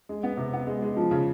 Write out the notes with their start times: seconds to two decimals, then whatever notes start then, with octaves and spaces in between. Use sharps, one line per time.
0.09 G#3
0.23 B3
0.37 C3
0.53 B3
0.67 G#3
0.82 G#3
0.97 F3
1.11 C#3